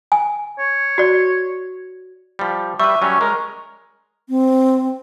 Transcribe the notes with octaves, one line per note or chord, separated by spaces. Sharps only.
G#5
C#5
F#4 D5
F3 G3
G3 B4 E5 C#6
F#3 G3 C#4
G#3 A#4
C4